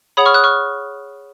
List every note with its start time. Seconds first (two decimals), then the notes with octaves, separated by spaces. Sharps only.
0.17 G#4 C#5 F#5 B5 D#6
0.25 C#6 F6
0.34 D#6 F#6
0.44 C#6 F6